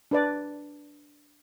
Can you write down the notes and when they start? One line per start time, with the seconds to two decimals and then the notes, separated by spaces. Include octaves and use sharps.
0.11 D4 B4 D5